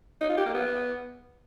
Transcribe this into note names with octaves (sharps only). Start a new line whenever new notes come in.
D#4
F4
G4
A#3
B3